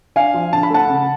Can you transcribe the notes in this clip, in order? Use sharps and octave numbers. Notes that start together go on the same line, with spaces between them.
D4 F5 G#5
F3
D3 A5
B5
A3 F#5 A5
C#3